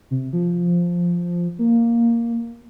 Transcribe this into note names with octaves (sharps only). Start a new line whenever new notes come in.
C3
F3
A#3